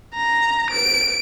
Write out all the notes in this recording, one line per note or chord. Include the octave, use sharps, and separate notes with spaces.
A#5
D7